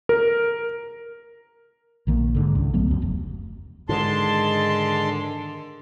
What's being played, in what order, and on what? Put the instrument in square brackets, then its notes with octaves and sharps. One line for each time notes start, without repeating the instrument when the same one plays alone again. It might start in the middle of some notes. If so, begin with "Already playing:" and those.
[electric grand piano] A#4
[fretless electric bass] A#1 D#3 A#3
G#2 D3
C#2
B1 F#3 A3 B3
C#2 F#2
F1
[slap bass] G#2 D#3 [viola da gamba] D3 [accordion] G#3 A5 C6